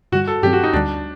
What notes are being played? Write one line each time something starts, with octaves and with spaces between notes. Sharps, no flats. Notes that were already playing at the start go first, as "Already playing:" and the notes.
G2 D3 G3 F#4
A4
G2 D#3 F#3 C4 G4
F#4
D#4
D2 D3 G3 D4